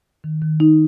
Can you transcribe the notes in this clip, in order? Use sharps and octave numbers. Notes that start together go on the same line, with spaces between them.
D#3
D#3
D#4